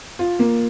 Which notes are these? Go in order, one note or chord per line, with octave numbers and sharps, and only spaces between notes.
F4
A#3